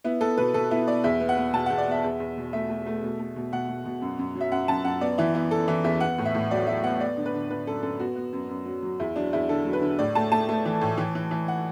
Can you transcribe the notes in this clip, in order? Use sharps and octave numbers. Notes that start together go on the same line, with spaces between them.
B3 E4
B3 A4
B2 B4
B2 A4
B3 E4
B3 D5
E2 E5
B3
F#5
B3
B2 A5
F#5
E2
D5
B3 E5
E2
E2
B2
A3 E5
A3
A3
B2
A3
B2
B2 F#5
B2
B2
F#2
F#2
F#3
E5
F#2 F#5
F#2 A5
F#2 F#5
B3 D5
E3 E4
B3 E4
B3 A4
E3 E4
E2 E5
B3 F#5
A2
E5
A2
F#3 D5
F#3 E5
B3 F#5
B3 D5
D3
B4
D3
D3 B4
F#2 A4
F#2 A4
B3 F#4
B3
F#2
F#2
F#3
F#3
E2 E4
F#3 D4
E2 E4
D3 A4
F#3
B4
D3
A2 D5
A3 A5
A3 A5
A3
E3
A2
E3
E3
E3
F#5